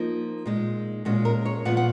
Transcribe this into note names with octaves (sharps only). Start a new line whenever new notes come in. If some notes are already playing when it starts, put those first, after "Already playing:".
Already playing: F3 A#3 D#4
A#2 G#3 D#4
A#2 G#3 C#4 F#4
A#4
C#5
A#2 F3 B3 F#5
F#5